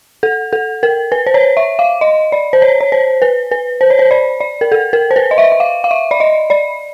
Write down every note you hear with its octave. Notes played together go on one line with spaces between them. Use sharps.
A4
A4
A#4
B4
C5
C#5
E5
F5
D#5
D5
C5
C#5
C#5
C5
B4
B4
C5
C#5
C5
D5
D5
A#4
A4
A#4
C5
B4
D#5
E5
E5
F5
F5
E5
D5
D#5
D5